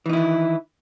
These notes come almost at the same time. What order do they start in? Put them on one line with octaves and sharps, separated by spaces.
E3 D#4 E4 D#3